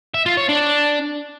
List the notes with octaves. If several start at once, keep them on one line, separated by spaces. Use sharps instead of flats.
E5
F4
C#5
D4